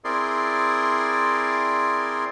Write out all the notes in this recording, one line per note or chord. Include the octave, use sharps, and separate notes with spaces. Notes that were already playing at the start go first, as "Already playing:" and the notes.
C4 E4 G#4 A#4 D5 C6